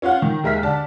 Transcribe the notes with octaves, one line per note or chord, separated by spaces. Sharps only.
C#4 F4 F5 F#5
D#3
D#2 G#3 A#4 E5 F6 B6
D3 D5 A5